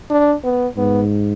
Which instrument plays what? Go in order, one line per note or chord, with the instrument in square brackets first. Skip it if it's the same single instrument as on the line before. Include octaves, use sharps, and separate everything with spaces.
[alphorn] D4
B3
[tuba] G#2 [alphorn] B3